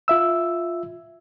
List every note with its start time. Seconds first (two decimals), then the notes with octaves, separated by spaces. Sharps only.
0.08 F4 E5 E6